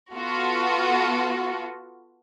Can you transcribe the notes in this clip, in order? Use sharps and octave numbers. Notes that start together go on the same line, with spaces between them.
B3 F4 F#4 A4